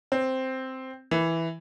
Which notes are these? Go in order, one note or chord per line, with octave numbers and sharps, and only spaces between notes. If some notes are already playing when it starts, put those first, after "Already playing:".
C4
E3